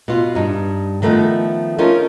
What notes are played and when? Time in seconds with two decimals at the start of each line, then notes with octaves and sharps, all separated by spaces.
0.08 B2 F4
0.35 G2 D#4
1.02 D#3 F3 A3 B3 D4 D#4
1.79 C#4 D#4 F4 A4 A#4